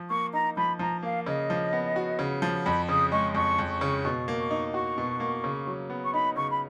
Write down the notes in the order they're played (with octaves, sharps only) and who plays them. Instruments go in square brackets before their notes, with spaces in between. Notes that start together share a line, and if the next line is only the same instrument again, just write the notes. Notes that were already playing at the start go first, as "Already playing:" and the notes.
Already playing: [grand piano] F3
[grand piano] A#3 [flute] C#6
[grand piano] D#4 [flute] A#5
[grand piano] F3 [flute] B5
[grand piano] F3 [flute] A#5
[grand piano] A#3 [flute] F5
[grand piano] C#3 [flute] D#5
[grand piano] F3
B3
F#4
C#3
F3
[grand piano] F2 [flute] B5
[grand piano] C#3 [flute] D#6
[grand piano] G#3 [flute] C#6
[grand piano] F2 [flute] C#6
[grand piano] F2
[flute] C#6
[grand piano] C#3
[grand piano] B2 [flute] C#6
[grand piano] A#3
[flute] C#6
[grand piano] D#4
[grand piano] F#4 [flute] C#6
[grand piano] B2
A#3
C#3
F#3
B3
[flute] C#6
[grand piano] D#4 [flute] B5
[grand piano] C#3 [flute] C#6
[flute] B5